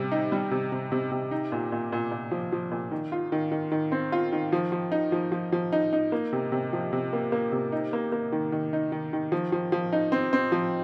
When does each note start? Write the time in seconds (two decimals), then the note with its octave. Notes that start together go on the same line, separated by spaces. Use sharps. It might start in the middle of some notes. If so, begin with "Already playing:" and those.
Already playing: C3 G3
0.12 D#4
0.32 G3
0.51 C3
0.72 C3
0.92 C3
1.12 C3
1.31 D#4
1.52 A#2
1.72 A#2
1.92 A#2
2.11 A#2
2.31 F3
2.52 F3
2.71 A#2
2.91 D#3
3.12 F4
3.32 D#3
3.52 D#3
3.72 D#3
3.92 C4
4.12 F4
4.32 D#3
4.52 F3
4.72 F3
4.92 D#4
5.12 F3
5.32 F3
5.52 F3
5.72 D#4
5.93 D#4
6.12 A#3
6.33 C3
6.52 C3
6.73 F3
6.93 C3
7.13 A#3
7.32 A#3
7.52 C3
7.72 D#4
7.93 A#3
8.12 A#3
8.32 D#3
8.52 D#3
8.73 D#4
8.92 D#3
9.13 D#3
9.32 F3
9.52 F3
9.72 F3
9.93 D#4
10.12 C4
10.33 C4
10.52 F3